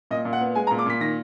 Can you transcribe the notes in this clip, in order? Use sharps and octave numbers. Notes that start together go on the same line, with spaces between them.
A#2 D#5
A#2
F#5
B3
G#3 G#5
A#5
A#2
D6
A#2 B6
D#3 A#6